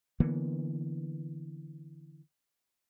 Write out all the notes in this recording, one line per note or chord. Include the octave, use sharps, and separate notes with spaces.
D3 E3 A#3 B3